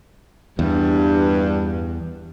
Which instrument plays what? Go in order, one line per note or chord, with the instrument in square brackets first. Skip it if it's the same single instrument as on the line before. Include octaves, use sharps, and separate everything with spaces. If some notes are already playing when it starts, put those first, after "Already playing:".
[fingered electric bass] E2 [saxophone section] G2